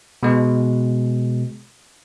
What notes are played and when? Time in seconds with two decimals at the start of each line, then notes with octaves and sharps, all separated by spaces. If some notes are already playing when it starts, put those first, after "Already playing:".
0.23 B2 G#3